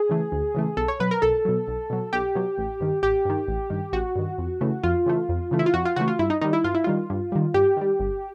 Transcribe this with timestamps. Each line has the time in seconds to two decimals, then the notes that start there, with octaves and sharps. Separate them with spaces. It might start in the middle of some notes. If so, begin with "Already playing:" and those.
Already playing: G#4
0.09 C#3 E3 A3
0.32 D2
0.55 C#3 E3 A3
0.77 B1 A4
0.88 C#5
1.00 B2 F#3 B4
1.11 A#4
1.22 B1 A4
1.45 B2 F#3
1.68 B1
1.90 B2 F#3
2.13 B1 G4
2.35 B2 F#3
2.58 A1
2.80 G2 D#3
3.03 A1 G4
3.25 G2 D#3
3.48 A1
3.70 G2 D#3
3.93 A1 F#4
4.16 G2 D#3
4.38 F2
4.61 C#3 E3 A3
4.83 F2 F4
5.06 C#3 E3 A3
5.29 F2
5.51 C#3 E3 A3
5.59 E4
5.66 F4
5.74 F2 F#4
5.85 F4
5.96 C#3 E3 A3 F#4
6.08 F4
6.19 G2 E4
6.30 D#4
6.41 D#3 G3 D#4
6.53 E4
6.64 G2 F4
6.75 E4
6.84 D#3 G3 F4
7.10 G2
7.32 D#3 G3
7.54 G2 G4
7.77 D#3 G3
7.99 G1